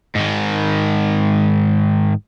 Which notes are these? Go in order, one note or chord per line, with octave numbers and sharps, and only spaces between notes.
G#2 D#3